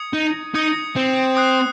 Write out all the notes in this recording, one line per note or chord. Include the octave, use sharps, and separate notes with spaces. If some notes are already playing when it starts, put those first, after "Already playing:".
Already playing: D#6 G#6 C#7
D#4
D#4 D#6 G#6 C#7
C4
D#6 F#6 C7